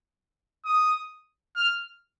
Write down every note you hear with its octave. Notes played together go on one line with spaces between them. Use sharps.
D#6
F6